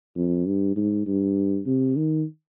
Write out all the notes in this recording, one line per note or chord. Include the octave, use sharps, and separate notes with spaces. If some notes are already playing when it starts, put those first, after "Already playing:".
F2
G2
G#2
G2
C3
D#3